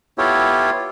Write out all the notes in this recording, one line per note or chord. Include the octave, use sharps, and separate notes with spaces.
B3 E4 F4 G4 A4 C#5